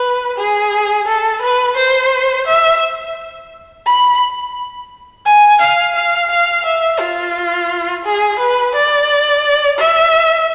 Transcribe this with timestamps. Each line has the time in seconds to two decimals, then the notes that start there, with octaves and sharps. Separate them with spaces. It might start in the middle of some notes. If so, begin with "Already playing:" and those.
Already playing: B4
0.38 G#4
1.07 A4
1.42 B4
1.76 C5
2.47 E5
3.86 B5
5.25 G#5
5.61 F5
5.95 F5
6.30 F5
6.65 E5
7.00 F4
8.04 G#4
8.40 B4
8.74 D5
9.78 E5